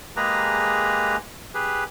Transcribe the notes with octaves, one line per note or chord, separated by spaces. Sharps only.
G#3 A#3 G4 G#4 B4 A#5
G4 G#4 B4